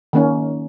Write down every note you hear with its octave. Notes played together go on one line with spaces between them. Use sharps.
D#3 A#3 C#4